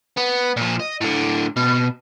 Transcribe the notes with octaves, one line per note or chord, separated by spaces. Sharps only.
B3
A#2 F3
D#5
A2 D3
B2